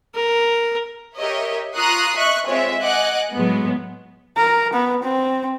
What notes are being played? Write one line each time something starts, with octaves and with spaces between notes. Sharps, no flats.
A#4
G4 A#4 C#5 D#5 E5
F4 A#5 C#6 D#6 F#6 C7
D#5 E5 C#6 F#6
G#3 C4 F4 C#5 E5
D#5 F#5 G#5 D6 F#6
A2 F#3 G#3 B3
A#4
B3
C4